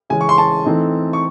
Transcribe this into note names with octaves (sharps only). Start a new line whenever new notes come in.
C#3 E3 G#3 C#4 G#5
C#6
C6
A5
E3 A3 C4 D#4
C#6